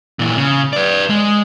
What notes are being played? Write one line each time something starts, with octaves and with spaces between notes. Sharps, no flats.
A#2 E3
C#3
B4 D5
G#3